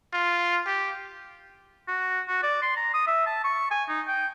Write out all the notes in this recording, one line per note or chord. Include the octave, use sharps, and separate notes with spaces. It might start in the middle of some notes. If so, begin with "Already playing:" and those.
F4
G4
F#4
F#4
D5
C6
A#5
D#6
E5
A5
C#6
G#5
D#4
G5